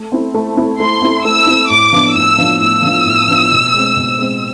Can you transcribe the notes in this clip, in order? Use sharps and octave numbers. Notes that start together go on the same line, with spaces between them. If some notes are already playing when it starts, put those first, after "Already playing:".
Already playing: A3
C4 E4
A3
C4 E4
A3 C6
C4 E4
A3 E6
C4 E4
A2 D6
F3 B3 D4 F4
A2 E6
F3 B3 D4 F4
A2 E6
F3 B3 D4 F4
A2
F3 B3 D4 F4
B2
G#3 C4
B2
G#3 C4